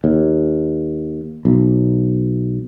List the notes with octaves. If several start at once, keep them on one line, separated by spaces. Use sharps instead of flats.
D#2
B1